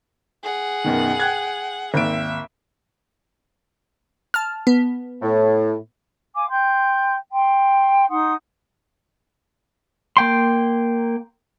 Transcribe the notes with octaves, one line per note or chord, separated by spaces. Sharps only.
G#4 F#5
F#2 B2 D#3
G5 F#6 G#6
G#1 D#2 E5 D7
A5 F6
B3
A2
F5 G#5 D6
G5 C6 G6
G5 C6
D#4 F#5 C6 D#6
A#3 G5 C6